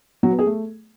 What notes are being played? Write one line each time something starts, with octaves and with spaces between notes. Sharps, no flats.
F#3
B3
G#4
A3